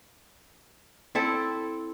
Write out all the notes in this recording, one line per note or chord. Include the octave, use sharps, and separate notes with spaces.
C4 E4 A4